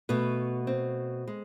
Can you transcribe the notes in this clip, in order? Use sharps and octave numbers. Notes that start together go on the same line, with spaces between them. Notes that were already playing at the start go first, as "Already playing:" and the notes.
B2 A3 B3
C4
G#3